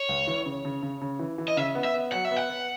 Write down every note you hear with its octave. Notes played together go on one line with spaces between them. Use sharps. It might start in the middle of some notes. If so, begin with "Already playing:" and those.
Already playing: C#5
C#2
E3
C#3
C#3
C#3
C#3
E3
E3
D#5
C#3 E5
B3
E5
B3
F#3 F#5
E5
B3
F#5
B3